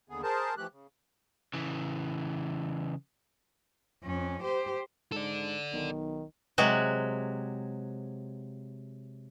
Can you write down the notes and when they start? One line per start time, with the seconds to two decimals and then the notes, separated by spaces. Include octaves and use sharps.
0.09 D#2 D3 B3 G#4
0.23 G#4 A#4 C5 A5
0.57 E3 F3 A3 G4 F#6
0.72 C#3
1.54 C#3 E3
4.04 F2 C#4
4.42 G4 C5
5.12 G#2 A4 D5
5.73 B1 D#3
6.58 C3 F#3 G#3 F#4